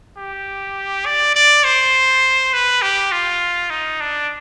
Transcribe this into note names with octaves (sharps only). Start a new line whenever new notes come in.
G4
D5
D5
C5
B4
G4
F4
D#4
D4